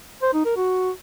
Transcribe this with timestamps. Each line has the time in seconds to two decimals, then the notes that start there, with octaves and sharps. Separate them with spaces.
0.22 C5
0.34 D#4
0.45 A#4
0.56 F#4